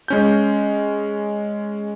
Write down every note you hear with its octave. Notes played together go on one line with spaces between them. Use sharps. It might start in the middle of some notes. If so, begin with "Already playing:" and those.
G#3 C#4 G6